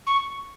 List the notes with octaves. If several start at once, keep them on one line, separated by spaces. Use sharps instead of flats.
C#6